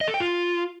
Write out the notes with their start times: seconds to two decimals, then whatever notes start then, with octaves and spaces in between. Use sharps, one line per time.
0.01 D#5
0.08 A4
0.14 G5
0.20 F4